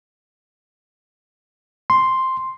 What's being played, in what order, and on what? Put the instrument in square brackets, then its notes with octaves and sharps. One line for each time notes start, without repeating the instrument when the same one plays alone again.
[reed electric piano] C6